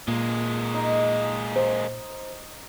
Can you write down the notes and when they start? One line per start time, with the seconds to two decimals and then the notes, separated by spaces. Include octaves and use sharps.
0.08 A#2 G#3 A#3
0.74 D#4
1.56 C5